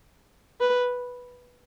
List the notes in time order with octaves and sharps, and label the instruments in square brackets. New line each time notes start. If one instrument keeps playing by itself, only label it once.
[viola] B4